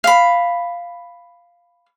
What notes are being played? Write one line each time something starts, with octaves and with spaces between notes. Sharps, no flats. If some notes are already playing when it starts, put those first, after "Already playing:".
F5 B5